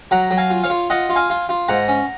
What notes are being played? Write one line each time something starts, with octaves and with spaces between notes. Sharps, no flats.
F#3 F#5 A#5
F#3
F5 G#5
F4
C#5 F5
F4
F4 D#5 F#5
F4
F5 G#5
F4
F4
G#2 F#5 A#5
C#4